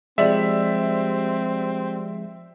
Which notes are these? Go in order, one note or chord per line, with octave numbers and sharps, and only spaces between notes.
C3 F3 G3 G#3 C4 E5